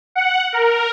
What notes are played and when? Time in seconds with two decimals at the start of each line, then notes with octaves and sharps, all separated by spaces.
0.15 F#5
0.53 A#4